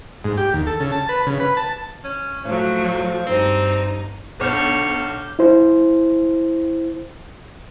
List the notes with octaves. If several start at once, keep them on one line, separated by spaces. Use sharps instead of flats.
G#2
G4
D#2
A4
C#3
A5
B4
C#3
B4
A5
C#4
A2 F3 F#3
G2 C4 D#4
B1 D3 C#5 D6 F6 G6
E4 C5